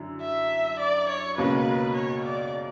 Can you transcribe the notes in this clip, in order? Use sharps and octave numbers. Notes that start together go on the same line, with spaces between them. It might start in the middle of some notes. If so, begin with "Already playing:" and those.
Already playing: F#2 D3 E4
E5
D5
C#5
C#2 B2 A#3 C#4 B4
C#5
D5